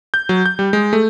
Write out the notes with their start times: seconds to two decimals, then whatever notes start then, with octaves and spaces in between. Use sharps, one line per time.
0.14 G6
0.29 F#3
0.46 G6
0.59 G3
0.73 G#3
0.93 A3